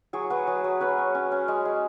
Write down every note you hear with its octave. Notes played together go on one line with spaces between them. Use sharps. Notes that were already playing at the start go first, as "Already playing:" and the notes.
F#3 G#4 C#5
F#3 F#4 B4
F#3 G#4
F#3
C#4 F#4 B4
C#4
C#4
C#4
G#3
G#3